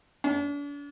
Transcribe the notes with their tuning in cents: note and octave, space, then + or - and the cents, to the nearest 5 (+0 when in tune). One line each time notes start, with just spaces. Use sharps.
D4 -40